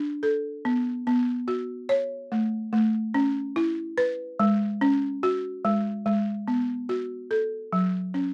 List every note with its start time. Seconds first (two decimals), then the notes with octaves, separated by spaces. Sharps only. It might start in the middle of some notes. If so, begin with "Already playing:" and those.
Already playing: D4
0.23 A4
0.65 B3
1.07 B3
1.48 F#4
1.89 C#5
2.32 A3
2.73 A3
3.14 C#4
3.56 E4
3.98 B4
4.39 G#3
4.81 C#4
5.23 F#4
5.65 G#3
6.06 G#3
6.48 B3
6.89 F#4
7.31 A4
7.73 F#3
8.14 C#4